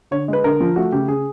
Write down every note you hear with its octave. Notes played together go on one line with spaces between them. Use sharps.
D3 C#5
G#3 B4
D3 A#4
F3
A3 F#4
C#3 G4
C#3 G#4